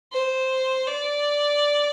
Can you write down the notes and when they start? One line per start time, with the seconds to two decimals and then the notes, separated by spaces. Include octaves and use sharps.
0.12 C5
0.87 D5